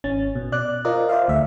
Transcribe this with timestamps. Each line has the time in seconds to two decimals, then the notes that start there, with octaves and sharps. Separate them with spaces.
0.04 G#1 C#4 A6
0.35 B2
0.52 D5 F#6
0.85 F4 A#4 C5 D5 D#5
1.09 C5 D5 E5 F5
1.28 D2 A3 E5